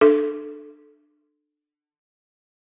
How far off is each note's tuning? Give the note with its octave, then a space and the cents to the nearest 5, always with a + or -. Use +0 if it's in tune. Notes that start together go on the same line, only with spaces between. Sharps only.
D4 +25 A4 -5